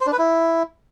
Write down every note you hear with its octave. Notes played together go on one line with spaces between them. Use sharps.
C5
D4
B4
E4